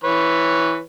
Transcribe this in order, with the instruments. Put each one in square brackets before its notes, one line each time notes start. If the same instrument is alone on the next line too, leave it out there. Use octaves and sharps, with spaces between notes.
[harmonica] E3 B4 C#5